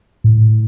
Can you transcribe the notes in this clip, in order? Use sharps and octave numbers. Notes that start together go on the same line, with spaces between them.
A2